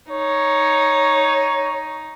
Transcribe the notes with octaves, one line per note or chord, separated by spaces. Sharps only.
D#4 C#5